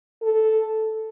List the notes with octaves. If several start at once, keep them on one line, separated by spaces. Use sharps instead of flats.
A4